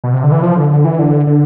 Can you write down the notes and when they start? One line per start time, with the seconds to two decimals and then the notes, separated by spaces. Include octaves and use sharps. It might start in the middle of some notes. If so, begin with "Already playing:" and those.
0.04 B2
0.13 C3
0.23 D3
0.32 E3
0.42 F3
0.56 D3
0.71 D3
0.84 E3
0.99 D3
1.27 D3